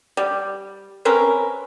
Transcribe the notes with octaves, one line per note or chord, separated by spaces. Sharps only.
G3
C4 C#4 A#4 B4